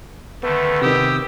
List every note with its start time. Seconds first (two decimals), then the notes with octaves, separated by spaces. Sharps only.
0.43 D3 D#3 A3 B3
0.82 C3 D#3 G4 D#6 E6